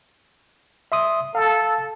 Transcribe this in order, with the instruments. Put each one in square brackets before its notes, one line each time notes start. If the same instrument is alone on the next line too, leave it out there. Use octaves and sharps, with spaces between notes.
[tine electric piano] E5 C6 D#6
[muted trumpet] A4 [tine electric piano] F5 A5